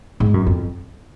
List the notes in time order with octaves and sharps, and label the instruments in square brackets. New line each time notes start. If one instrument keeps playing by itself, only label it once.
[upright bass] G#2
F#2
F2